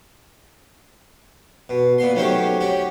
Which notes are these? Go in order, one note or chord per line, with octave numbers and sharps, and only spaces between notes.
B2
A#2 B3 C6
D#3 F#3 A3 C#4 G4 C5
C#4 F#4 G4